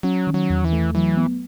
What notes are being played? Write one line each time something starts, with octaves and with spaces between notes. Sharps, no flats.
F#3 C#4
D#3
F#3
E2
E3
A3
E3 F#3
B3